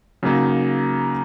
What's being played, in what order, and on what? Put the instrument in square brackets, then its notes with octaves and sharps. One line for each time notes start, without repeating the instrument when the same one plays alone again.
[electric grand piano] C#3 F#3 A#3 D#4